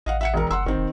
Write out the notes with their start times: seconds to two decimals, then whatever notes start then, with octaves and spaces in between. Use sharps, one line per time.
0.06 A1 D#5 F5 F#5
0.21 E5 F#5 C#7
0.34 E1 A#4
0.51 F#1 F#5 C6 E6
0.66 G1 D#3 C4
0.78 E1